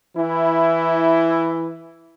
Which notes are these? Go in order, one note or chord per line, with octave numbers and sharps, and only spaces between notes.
E3 E4